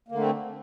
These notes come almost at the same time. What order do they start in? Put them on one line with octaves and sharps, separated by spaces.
A#3 D3 A3 C4